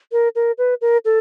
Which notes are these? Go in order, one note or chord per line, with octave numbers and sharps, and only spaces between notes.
A#4
A#4
B4
A#4
A4